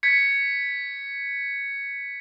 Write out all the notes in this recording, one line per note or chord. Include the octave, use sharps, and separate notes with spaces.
G#6 B6 C#7